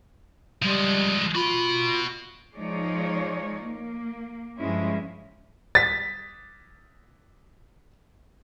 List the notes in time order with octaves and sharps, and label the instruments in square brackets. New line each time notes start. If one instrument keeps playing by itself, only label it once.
[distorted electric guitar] F3 G#3 [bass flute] G3
[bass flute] F4 [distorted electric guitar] F#4 B5
[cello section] F3 G#3 D#4 C#5 D5
A#3
G2 F3 G#3 C#4 E4
[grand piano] A6 B6